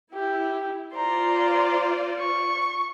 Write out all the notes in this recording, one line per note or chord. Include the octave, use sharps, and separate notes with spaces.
E4 G4
F4 C5 D5 A#5 C6
C#6